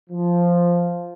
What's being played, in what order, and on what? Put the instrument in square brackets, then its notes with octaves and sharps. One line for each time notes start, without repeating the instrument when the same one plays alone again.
[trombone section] F3